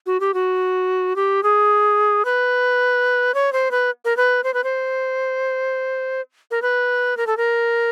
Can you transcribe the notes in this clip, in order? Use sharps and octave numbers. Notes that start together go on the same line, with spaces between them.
F#4
G4
F#4
G4
G#4
B4
C#5
C5
B4
A#4
B4
C5
B4
C5
A#4
B4
A#4
A4
A#4